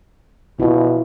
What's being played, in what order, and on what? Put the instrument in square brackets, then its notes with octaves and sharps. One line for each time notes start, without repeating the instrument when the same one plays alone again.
[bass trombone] B2 [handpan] E4 F4